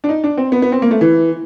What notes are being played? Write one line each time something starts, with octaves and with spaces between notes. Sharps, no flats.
D4
D#4
D4
C4
B3
B3
C4
A#3
A3
E3